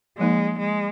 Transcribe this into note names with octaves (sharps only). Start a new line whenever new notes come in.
F3 G#3 A#3 D#4
G#3